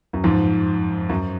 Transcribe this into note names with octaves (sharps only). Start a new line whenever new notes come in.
F#2
F2 G#2
F#2